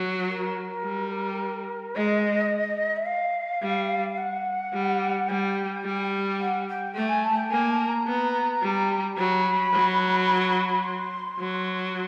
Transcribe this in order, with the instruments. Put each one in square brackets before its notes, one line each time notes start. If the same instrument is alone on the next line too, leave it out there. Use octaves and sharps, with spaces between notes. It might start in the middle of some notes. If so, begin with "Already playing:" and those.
Already playing: [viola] F#3
[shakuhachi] A#4
[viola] G3
[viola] G#3 [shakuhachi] D#5
[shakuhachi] E5
F5
[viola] G3
[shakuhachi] F#5
[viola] G3
[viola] G3 [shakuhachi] G5
[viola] G3
[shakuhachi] F#5
G5
[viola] A3 [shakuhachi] G5
[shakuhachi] G#5
A5
G5
[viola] A#3 [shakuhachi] G#5
[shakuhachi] A5
A#5
[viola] B3
G3
[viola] F#3 [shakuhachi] B5
[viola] F#3
[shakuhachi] C6
[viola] F#3